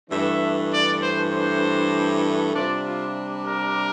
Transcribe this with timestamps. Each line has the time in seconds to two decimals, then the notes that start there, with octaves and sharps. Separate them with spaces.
0.10 G2 E3 A3 D4 E5
0.71 D5
1.01 C5
1.32 C5
2.53 C3 G3 D4 F4 D5
2.83 F4
3.44 A#4